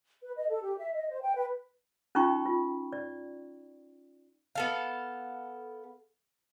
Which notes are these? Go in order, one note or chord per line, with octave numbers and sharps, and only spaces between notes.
B4
D#5
A4
G4
E5
D#5
C5
G5
B4
C#4 D#4 F4 G5 A#5 C#6
F4
D5
B3 A4 F5